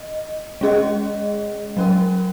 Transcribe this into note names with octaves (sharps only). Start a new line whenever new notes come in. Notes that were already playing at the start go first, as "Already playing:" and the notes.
Already playing: D#5
G#3 C#4 G#4 D#5
F#3 C#4 A#4